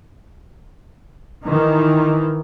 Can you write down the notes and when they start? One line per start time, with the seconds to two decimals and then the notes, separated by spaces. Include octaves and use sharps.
1.46 D#3 E3